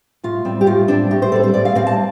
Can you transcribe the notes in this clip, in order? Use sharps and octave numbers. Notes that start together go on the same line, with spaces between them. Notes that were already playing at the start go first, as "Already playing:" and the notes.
A2 F4
G3 C4
G4
A2 F4
G3 C4 D4
A2 G4
C5
G3 C4 A4
C5
A2 D5
F5
G3 C4 F5
A5